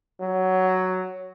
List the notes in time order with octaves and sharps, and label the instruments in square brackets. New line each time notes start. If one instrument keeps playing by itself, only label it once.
[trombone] F#3